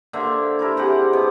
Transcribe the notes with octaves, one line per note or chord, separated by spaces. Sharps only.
D3 A#3 C5 E5
E4 A4 A#4
C3 G4 G#4 F#5
B2